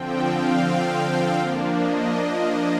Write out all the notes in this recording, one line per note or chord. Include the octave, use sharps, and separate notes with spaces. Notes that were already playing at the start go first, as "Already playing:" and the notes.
Already playing: D3 F3 C4 G5
F5
F3 A#3 D4
D#5
D#5